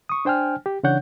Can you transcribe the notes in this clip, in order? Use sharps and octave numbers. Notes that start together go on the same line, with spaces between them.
C#6 D#6
D4 C5 G5 G#5 F6
G4
C#3 E3 D4 C#5 F#5 G6